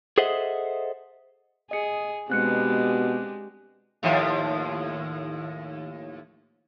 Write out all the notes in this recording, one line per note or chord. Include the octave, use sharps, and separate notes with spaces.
G#4 A4 C5 D#5 E5 F#5
G#4 D#5 C#7
B2 G#3 C4 D4 G4 F#6 C#7
D#2 A2 F3